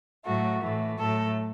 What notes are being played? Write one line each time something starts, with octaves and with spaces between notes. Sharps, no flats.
A2 F#3 A3 F#4
A2 E3 A3
A2 F#3 A3 A4